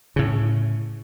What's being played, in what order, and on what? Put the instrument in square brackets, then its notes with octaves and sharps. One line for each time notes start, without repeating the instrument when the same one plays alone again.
[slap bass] A2 C#3